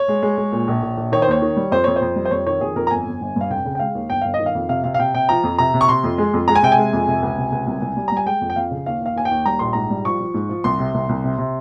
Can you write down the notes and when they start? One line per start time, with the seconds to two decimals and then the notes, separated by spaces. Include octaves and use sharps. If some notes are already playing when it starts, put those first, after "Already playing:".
Already playing: C#5
0.08 G#3
0.22 G#3
0.38 G#3
0.52 A#2
0.68 A#1
0.83 A#1
0.98 A#1
1.12 D#3 C#5
1.22 C5
1.28 D#2 C#5
1.42 D#3
1.57 G3
1.72 F2 C5
1.84 F2 C#5
1.96 C5
2.01 F2
2.16 G3
2.25 C5
2.31 F2 C#5
2.46 D#3 C#5
2.61 F2 G#4
2.76 F2 A#4
2.87 A#5
2.91 G1 G#5
3.06 G1
3.21 G1
3.36 G2 F5
3.50 F1 G5
3.65 C#3
3.75 G5
3.79 G#3 F5
3.95 D#2
4.09 G1 G5
4.21 G1 F5
4.34 D#5
4.39 D#3
4.46 F5
4.55 F2
4.69 C3 F5
4.84 C3 F5
4.94 F5
4.99 C3 G5
5.14 C3 G5
5.29 F3 A#5
5.44 F2
5.58 C3 A#5
5.74 C3
5.81 C#6
5.89 C3 C6
6.04 F2
6.18 G#3
6.34 F2
6.48 G#3 A#5
6.55 G#5
6.63 C3 G5
6.72 G#5
6.78 G#3
6.93 F2
7.07 C3
7.23 C#2
7.38 C3
7.52 C#2
7.67 C2
7.82 C2
7.97 G3
8.08 G3 A#5
8.17 G#5
8.26 G#3 G5
8.41 F2
8.50 G5
8.56 F2 F5
8.71 C#3
8.86 D#2 F5
9.01 D#2 F5
9.16 D#2 G#5
9.25 G5
9.31 D#2
9.46 G3 A#5
9.59 A#1 C6
9.73 G#2 A#5
9.90 G3
10.05 F3 C#6
10.20 F3
10.34 G#2
10.49 F3
10.64 C2 C6
10.79 C3
10.94 C2
11.09 C2
11.24 C3
11.38 C3